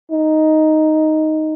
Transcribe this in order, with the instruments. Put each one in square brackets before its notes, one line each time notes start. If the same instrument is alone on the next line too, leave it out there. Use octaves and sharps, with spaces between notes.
[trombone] D#4